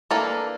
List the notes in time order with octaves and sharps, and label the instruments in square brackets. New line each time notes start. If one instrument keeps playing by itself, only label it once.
[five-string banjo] E3 A#3 D4 A4